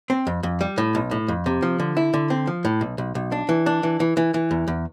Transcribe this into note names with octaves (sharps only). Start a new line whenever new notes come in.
C4
F2
F2
G3
A2
B1
A2
F2
C3
F3
D3
E4
D3
C4
F3
A2
B1
B1
B1
D4
E3
D4
E3
E3
E3
E3
E2
E2